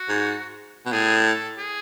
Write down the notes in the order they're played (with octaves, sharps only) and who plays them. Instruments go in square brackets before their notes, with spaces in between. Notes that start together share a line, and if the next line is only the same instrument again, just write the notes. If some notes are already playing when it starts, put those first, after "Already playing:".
Already playing: [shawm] F#4
[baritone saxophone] G#2
B2
[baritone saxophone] A2 [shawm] G#4
[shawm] A4
G#4